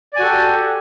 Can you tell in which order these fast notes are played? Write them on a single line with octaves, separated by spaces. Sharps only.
D5 G#5 F#4 A4 G4